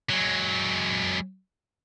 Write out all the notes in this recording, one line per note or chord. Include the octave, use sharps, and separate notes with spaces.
F#3 G#3